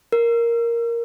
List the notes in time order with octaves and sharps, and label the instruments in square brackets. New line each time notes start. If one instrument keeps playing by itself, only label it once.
[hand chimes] A#4